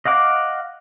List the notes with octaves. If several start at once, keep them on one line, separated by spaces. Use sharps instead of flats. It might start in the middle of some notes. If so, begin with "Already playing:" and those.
D#5 F5 F#5 D6